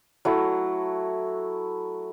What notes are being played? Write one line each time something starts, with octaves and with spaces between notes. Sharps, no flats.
F#3 A3 E4